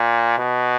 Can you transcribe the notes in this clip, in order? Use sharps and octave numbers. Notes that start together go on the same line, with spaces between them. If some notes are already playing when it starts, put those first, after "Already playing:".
Already playing: A#2
B2